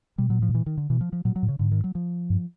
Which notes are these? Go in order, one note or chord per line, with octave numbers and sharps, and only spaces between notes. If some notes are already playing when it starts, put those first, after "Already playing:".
B2 G3
A#2 F#3
A2 F3
A#2
E3
D#3
D3
B2 E3
F3
F3
A#2 F#3
F#3
A2
C#3
G#2 D3
D#3
F#3
F3
G2